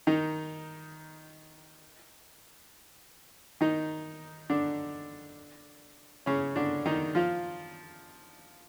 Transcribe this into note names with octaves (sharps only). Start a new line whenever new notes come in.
D#3 D#4
D#3 D#4
D3 D4
C#3 C#4
D3 D4
D#3 D#4
F3 F4